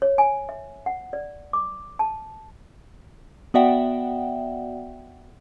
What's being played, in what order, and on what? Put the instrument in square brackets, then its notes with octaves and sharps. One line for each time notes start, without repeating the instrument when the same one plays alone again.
[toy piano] C#5
G#5
E5
F#5
D5
D6
A5
[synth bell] B3 F#4 D5 E5 F#5 G5